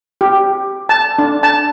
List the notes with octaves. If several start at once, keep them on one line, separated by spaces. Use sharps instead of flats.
G4
A5
D4
A5